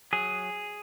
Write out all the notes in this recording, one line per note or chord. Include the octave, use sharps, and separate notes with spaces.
F#3 G#4